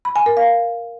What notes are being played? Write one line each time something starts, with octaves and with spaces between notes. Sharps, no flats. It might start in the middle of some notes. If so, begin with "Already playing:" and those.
B5
G#5
A#4
F5